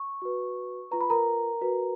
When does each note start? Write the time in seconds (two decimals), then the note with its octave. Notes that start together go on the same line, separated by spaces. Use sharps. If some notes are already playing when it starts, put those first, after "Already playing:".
Already playing: C#6
0.22 F#4 B4
0.91 F4 B4 A#5
1.01 B5
1.10 A#4 A#5
1.61 F#4 B4